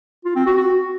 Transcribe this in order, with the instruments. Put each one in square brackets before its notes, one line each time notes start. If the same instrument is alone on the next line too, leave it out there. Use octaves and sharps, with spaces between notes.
[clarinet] F4
C4
F#4
F#4